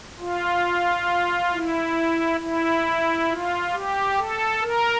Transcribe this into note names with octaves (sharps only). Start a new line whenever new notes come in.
F4
E4
E4
F4
G4
A4
A#4